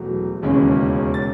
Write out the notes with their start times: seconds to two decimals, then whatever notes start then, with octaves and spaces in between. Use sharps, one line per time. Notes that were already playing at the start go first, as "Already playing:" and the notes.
Already playing: E1 F#3 A3
0.42 E1 D#2 C#3 G#3 C#4
1.14 A6